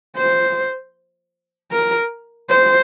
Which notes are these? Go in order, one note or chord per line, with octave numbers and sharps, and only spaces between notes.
C5
A#4
C5